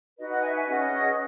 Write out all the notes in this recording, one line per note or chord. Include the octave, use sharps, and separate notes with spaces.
D#4 F#4 B4 D#5
D#5 F#5
E5 G#5
E5 G#5
C#4 G#4 B4 D#5 F#5